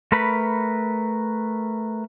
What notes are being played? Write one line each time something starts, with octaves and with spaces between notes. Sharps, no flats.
A3 A#4 B4 B5